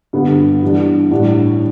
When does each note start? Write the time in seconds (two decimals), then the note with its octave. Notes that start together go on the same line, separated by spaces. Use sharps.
0.13 G2 D3 G3 B3
0.63 G2 E3 G3 D4
1.11 A2 G3 D4